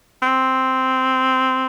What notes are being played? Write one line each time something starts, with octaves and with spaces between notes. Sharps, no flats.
C4